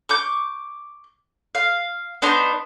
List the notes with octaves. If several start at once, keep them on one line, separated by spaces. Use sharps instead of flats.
C#6 D6 G6
F5
B3 D4 D#4 C5